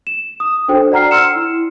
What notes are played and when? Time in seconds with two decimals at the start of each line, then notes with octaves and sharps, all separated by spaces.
0.07 E7
0.40 D#6
0.68 D4 F#4 A4 C5 G5
0.92 D5 F#5 A#5 F6 C7
1.11 C6 E6 F6 C#7 E7
1.36 E4